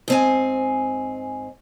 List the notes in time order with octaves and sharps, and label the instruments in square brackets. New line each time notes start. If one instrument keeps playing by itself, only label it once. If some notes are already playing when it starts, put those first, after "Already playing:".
[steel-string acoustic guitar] G#2 C4 G#5